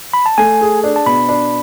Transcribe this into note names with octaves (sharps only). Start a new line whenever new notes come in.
B5
A5
A3 G#5
G#4
D4
A5
B2 B5
D4